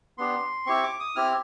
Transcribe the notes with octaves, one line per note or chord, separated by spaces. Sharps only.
B3 D4 G4 C6
C4 E4 G4 C#6
D6
D#6
C4 E4 G4 F6